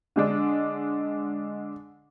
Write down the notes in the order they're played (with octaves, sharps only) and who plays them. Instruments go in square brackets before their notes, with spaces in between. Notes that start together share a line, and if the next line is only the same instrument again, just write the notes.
[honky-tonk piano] D3 G#3 D4